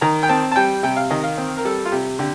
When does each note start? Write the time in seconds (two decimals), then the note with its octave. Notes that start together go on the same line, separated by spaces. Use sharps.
0.01 D#3 A#5
0.23 G5
0.29 C4 A5
0.52 A5
0.56 G3 G5
0.83 C3 G5
0.97 F5
1.10 D#3 D#5
1.23 F5
1.38 C4
1.57 A#4
1.65 G3 A4
1.85 F4
1.92 C3 G4
2.19 D3 G4